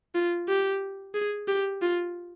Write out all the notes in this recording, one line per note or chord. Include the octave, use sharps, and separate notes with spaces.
F4
G4
G#4
G4
F4